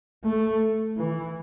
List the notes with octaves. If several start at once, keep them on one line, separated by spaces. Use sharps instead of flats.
A3
E3